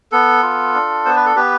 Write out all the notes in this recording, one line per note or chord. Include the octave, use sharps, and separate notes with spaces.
B3 A4
F4
D4
B3 C5
B4
A4
B3 G4 B4